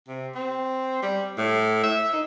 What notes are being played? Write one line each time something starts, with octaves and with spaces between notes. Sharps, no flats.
C3
C4
G3
A2
E5
D#4